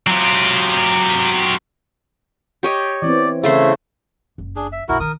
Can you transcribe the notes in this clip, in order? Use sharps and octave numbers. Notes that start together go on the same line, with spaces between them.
F#3 C4 F4 G4
G4 C#5 D#5
E3 B3 C4 D5
C#3 A3 C5 E5
F#1
D4 G#4
E5
B1 G2 E4 F#4 A#4
D#3 A#4 D#6